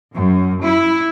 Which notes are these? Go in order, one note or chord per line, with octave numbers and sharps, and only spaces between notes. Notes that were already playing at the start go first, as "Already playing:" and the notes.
F#2
E4